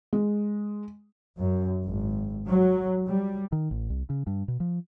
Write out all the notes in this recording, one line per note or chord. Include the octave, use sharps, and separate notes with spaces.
G#3
F#2
G#1
F#3
G3
D#3
A1
C2
C#3
G2
B2
F3